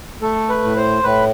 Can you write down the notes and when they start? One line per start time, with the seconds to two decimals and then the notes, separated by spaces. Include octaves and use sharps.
0.22 A3 A4
0.49 B4
0.63 A2
0.77 C5
1.03 A2 B4